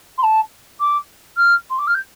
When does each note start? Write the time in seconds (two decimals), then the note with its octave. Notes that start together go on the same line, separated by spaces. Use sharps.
0.18 C6
0.23 A5
0.80 D6
1.37 F6
1.70 C6
1.79 D6
1.87 F6
1.95 G6